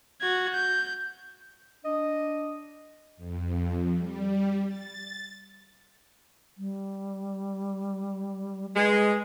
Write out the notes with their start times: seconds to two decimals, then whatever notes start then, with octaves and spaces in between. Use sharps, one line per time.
0.21 F#4 G#6
0.54 G6
1.84 D4 D#5
3.17 F2
3.97 G3
4.67 A6
6.58 G3
8.75 G#3 B4